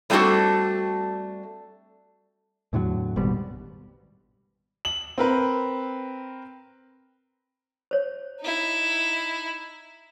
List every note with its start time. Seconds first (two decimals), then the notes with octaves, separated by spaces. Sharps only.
0.10 G3 A3 C4 D4 F#4 A4
2.73 E2 A2 D3 F#3
3.16 G#1 G#2 B2 G3
4.85 F#7
5.18 C4 A#4 B4
7.91 C5 C#5
8.40 D#4 E4